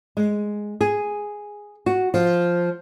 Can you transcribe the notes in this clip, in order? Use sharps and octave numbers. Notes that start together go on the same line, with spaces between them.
G#3
G#4
F#4
F3